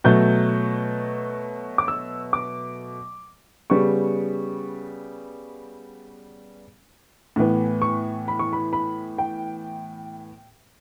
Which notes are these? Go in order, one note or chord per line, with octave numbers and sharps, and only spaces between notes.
B2 F#3 A3 G6
D6
E6
D6
C#3 G3 B3 C#6
A2 E3 B3
C#6
B5
C#6
B5
B5
G5